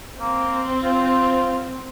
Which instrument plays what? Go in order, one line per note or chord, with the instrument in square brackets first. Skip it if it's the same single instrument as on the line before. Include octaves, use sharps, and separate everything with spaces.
[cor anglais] A#3 [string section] C4
[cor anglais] F4